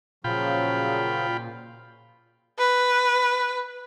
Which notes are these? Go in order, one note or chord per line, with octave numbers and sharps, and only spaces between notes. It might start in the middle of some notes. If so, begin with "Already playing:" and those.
A#2 C#3 F3 F#3 F4 G5 B5
B4